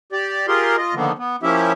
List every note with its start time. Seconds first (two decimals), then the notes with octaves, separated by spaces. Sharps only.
0.12 G4 D5
0.48 F4 G4 G#4 A#4 C6
0.78 F4 D#5
0.95 D3 D#3 F3 A#3 B3
1.19 B3
1.43 F3 A#3 C#4 E4 G4 E5